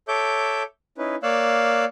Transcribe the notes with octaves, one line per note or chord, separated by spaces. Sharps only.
A4 C#5 E5 D6 G6
C#4 D#4 E4 B4
A#3 C#5 D5 F5 E6 F#6